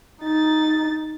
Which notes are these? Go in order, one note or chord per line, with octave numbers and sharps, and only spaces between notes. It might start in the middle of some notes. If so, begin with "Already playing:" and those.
D#4 A6